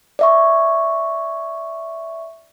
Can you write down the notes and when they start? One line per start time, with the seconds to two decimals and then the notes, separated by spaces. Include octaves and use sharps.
0.19 D5 E5 C#6